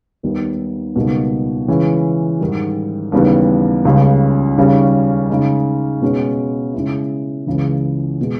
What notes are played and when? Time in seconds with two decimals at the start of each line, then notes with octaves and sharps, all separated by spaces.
0.23 D#2 D#3 G3 B3 D#4
0.96 C#2 B2 G3 A#3 D#4
1.68 C#3 E3 G#3 C#4
2.40 G#2 D#3 G3
3.12 D#2 C#3 E3 G3 B3
3.85 C#2 C#3 G3 C#4
4.57 D#2 C#3 G3 C#4
5.29 C#3 G#3 D#4
6.02 B2 G#3 C#4
6.74 C#3 G#3 C#4 E4
7.47 C#2 C#3 E3
8.21 B2 G#3